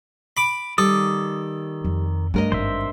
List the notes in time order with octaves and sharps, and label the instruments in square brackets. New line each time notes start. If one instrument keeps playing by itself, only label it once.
[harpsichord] B5 D6
[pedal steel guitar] D#3 D6 D#6 [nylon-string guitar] G3 [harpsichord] A4
[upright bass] F2
[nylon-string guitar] G2 A#4 D#5 [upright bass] A3
[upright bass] G#1 [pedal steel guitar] C5 E5